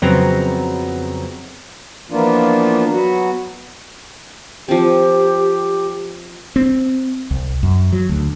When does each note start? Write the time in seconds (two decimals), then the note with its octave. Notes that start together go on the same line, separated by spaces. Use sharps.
0.02 F2 C#3 F#3 B3 C4 A#5
2.11 E3 F3 A#3 B3 D4 F4
2.91 F#3 B3 F#4
4.69 F3 C4 G4
6.56 C4
7.31 C2
7.63 F#2
7.93 F#3
8.09 D2